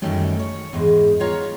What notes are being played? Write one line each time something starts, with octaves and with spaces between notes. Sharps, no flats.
F#2 D#3 F#3 G3 A3 C#4
C#5
E2 G#2 G#3
B3 F4 C#5 A#5